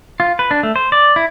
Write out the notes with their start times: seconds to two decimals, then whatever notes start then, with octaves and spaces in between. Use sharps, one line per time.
0.20 F4
0.39 B4
0.51 D4
0.63 A3
0.76 C5
0.92 D5
1.16 E4